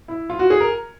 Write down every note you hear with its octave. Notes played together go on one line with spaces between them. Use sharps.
E4
F4
F#4
G#4
A#4